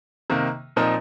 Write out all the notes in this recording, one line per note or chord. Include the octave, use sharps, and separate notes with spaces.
C3 D#3 A#3
A#2 F3 C4 D#4 A#4